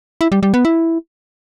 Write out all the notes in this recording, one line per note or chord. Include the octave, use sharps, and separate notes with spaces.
E4
G3
G3
B3
E4